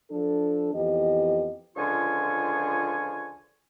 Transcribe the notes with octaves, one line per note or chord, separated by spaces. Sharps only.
F3 D4 A4
F2 E3 B3 G4 D#5
C#2 D3 F3 F4 G#5 C#6